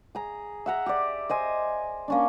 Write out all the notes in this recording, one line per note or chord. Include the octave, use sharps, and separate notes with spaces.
G#4 A#5
E5 F#5 A#5
G4 D5
C5 D#5 G#5
A#3 C#4 D4